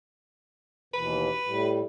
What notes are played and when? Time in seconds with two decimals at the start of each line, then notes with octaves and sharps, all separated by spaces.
0.94 D#2 B2 E3 B4
1.45 A2 G3